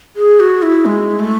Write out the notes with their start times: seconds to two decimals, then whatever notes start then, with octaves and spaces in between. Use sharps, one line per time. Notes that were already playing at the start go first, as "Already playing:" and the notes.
0.16 G#4
0.40 F#4
0.62 E4
0.86 G#3
1.20 A3